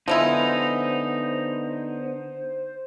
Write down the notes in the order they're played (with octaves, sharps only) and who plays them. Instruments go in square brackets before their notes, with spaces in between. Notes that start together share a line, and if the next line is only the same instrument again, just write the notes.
[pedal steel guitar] D3 B3 [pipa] F3 G#3 E4 [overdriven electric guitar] D#4 [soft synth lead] C5